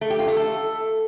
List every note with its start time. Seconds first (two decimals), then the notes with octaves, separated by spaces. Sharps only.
0.01 A3
0.10 G4
0.19 F4
0.28 A3
0.37 A4